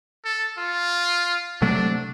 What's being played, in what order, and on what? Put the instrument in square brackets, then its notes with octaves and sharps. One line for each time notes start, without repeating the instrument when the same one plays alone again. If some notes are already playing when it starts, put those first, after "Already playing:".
[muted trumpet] A4
F4
[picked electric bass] C3 F#3 A3 [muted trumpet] D4